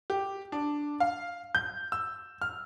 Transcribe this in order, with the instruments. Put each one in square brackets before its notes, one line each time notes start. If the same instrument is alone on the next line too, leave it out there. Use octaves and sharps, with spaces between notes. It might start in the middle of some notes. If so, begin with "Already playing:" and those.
[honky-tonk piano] G4
D4
F5
G6
E6
F6